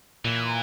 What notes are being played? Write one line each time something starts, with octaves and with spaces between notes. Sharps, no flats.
A#2 E3